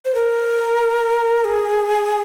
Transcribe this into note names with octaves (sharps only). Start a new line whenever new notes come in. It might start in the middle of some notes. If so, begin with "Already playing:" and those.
C5
A#4
G#4